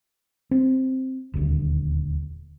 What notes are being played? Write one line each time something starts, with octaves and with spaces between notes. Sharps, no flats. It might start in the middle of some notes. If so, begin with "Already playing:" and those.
C4
D#1 D2